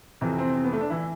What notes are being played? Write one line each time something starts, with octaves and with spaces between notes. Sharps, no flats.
F2 C3 E3
C4
C4
B3
A3
D4
E3 E4